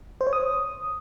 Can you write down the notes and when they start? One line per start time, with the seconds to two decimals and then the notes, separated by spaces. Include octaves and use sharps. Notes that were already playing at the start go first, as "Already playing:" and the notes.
0.21 C5
0.27 C#5
0.33 D#6